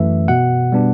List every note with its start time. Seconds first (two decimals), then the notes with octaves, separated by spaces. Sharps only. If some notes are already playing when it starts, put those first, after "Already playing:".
Already playing: F#2 E3 A3 E5
0.28 B2 F#5
0.72 G3 B3 D4